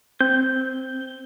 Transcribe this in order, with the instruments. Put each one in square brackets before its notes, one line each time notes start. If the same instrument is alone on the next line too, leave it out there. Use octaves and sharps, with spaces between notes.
[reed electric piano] C4 [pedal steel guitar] G6